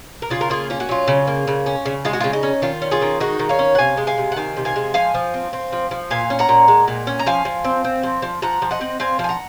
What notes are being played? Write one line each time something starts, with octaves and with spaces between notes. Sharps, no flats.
A#4
C#3 F4 G#4
A#4
A#3 F4 G#4
C#4 F4
F#4
F#3 F4
C#3
A#3
C#3
C#4
C#3
G#3 F4
F#4
C#3 F4
D#4
C#4
D#3 F4
C#4
F4 G#4
D#3
G#3 D#4 F#4
D#3
C#5 F5
C#4
F#5
C3 F5 G#5
G#3
F5 G#5
C3
F#5
D#3 F5 G#5
C3
F5 G#5
G#3
F3 F5 G#5
F3
C4
C4
F3
F3
A#2 F5 G#5
C#4
F#5 A#5
A#2
G#3
A#2
C#4
A#5
F3 F5 G#5
F3
C4
C4
F3
F3
F3 F#5 A#5
F3
D#5 F#5
C4
C4 F5 G#5
F3
G#5
F#5 A#5